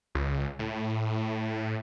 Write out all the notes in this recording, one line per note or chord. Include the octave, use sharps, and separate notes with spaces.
C#2
A2